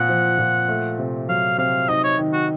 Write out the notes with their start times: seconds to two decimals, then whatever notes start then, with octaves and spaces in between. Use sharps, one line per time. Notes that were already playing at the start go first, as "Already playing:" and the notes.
Already playing: A#2 C4 F#5
0.09 F3
0.39 A#2
0.68 A3
0.99 C3
1.29 F#3 F5
1.58 C3 F5
1.89 D#4 D#5
2.04 C#5
2.19 D#3
2.33 F#4